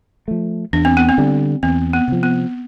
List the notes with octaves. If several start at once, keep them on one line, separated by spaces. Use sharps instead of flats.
F3 A3
E2 D4
C4
B3
C4
D3 G3
E2 C4
B3
C3 F3
B3